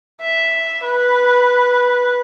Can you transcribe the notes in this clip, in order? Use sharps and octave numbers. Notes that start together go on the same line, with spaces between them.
E5
B4